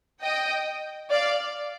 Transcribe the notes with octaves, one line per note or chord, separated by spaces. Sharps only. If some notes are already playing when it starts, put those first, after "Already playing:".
D#5 G5
D5 F5